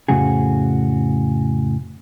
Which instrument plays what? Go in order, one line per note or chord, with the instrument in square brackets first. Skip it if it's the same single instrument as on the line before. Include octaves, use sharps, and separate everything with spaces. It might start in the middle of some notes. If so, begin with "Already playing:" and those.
[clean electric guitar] F2 A2 C#3 F#4 G#4